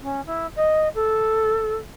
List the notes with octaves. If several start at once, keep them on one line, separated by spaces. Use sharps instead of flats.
C#4
E4
D#5
A4